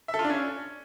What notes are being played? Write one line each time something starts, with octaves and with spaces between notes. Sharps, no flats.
E5
A4
F4
D4
C#4